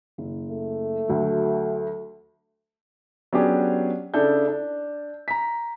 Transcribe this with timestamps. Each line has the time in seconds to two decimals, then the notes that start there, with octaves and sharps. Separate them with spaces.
0.18 F#1
0.51 A3
1.08 D2 F#3
3.33 F#3 B3 C#4 D4 G4 G#4
4.14 C#3 D4 E4 A4 G6
4.48 D4
5.28 A#5 B6